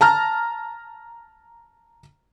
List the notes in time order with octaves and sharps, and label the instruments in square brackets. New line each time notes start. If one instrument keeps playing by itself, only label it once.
[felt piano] A5 A#5 F6